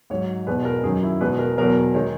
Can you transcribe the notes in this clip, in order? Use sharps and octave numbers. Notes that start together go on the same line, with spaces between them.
G#2 F#3 C#5
E2 B2 G#3 B4
A#4
F#2 D#3 F#3 G#4
E4
E2 B2 G#3 B4
A#4
E2 B2 F#3 A#4
D#3 G#3 C#5